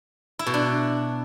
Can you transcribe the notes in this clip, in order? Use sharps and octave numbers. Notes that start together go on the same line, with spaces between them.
E4
B2
D4